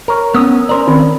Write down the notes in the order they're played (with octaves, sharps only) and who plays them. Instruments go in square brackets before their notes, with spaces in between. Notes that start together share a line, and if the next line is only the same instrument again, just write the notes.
[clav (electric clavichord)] A#4 C#5
[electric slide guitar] B3 C#4 [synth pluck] D#6 E6
[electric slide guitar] C#4 A#4 D5 [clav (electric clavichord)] C5 A#5
[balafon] D#3 [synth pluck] C4